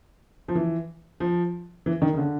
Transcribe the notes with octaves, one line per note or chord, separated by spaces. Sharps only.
F3
E3
F3
E3
D#3
C#3
D3